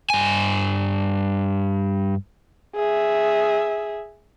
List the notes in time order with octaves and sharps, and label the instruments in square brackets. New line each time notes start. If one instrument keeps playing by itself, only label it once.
[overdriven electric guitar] G2 G#5
[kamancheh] G#4 E5